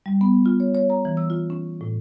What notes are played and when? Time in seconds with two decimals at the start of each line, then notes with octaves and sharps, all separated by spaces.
0.06 G3
0.21 B3
0.46 F4
0.60 C#5
0.75 C#5
0.90 A#5
1.05 E3
1.17 E6
1.30 F4
1.50 C#4
1.81 A2